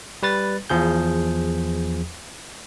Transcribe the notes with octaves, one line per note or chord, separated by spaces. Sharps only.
G3 B4 A6
E2 F3 G#4 G6